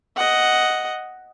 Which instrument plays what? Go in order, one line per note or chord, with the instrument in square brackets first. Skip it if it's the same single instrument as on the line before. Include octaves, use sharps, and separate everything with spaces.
[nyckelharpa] D#5 F#5